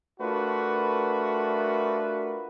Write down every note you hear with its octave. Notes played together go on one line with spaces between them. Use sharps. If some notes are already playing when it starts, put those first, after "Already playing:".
A3 D4 F4 F#4 A#4 B4